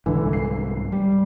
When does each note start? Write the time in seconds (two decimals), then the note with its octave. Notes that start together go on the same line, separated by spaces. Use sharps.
0.06 C2 G#2 D3 E3
0.33 C7
0.92 G3